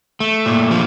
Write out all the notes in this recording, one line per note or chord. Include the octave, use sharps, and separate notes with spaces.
A3
A#2
F3